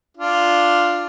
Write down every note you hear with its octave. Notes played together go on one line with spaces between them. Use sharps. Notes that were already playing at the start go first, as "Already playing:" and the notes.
D4 F4